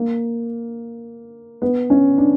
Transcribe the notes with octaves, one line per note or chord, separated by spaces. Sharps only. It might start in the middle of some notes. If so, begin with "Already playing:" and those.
Already playing: A#3
B3
C#4
D4